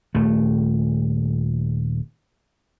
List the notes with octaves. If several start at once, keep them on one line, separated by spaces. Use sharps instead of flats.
D#1 A3